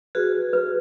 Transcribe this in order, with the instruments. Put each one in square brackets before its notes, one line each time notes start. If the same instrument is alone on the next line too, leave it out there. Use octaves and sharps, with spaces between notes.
[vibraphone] F#4 G#4 [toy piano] B4
[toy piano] B4